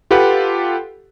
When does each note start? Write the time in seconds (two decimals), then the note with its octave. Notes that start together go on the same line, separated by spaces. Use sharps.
0.11 F4 G4 A4 B4 F#5